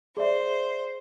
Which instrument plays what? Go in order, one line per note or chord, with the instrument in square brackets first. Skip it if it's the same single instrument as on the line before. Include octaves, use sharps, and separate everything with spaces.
[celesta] G#4 D5 E5 [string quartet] C5